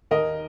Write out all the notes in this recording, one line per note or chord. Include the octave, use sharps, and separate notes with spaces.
D#2 A#4 D#5